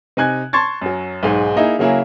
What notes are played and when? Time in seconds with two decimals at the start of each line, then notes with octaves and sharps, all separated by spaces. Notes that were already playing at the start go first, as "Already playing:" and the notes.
0.17 C3 D#4 G#5 F#6 G#6
0.53 A5 C6 C#6 G#6 A6
0.81 F#2 F#3
1.23 B1 G#2 G#3
1.56 A#3 D#4 E4 G#4
1.79 C#3 F#3 A#3 E4 G#4